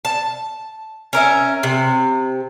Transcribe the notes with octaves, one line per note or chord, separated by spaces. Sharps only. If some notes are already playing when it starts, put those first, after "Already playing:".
A5
C#4 A#4 E5
C3